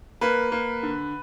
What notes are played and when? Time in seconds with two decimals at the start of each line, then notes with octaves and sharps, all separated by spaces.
0.21 A#3 B4
0.52 A#3
0.83 D3